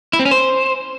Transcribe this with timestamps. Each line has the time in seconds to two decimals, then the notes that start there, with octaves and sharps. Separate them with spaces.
0.13 E4
0.19 C4
0.25 C#4
0.31 C5